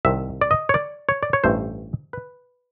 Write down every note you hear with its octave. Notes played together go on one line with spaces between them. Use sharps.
C2 C3 D#3 E5
D5
D#5
C#5
D5
C#5
D5
C#5
A1 G2 E3 A3 C5
B4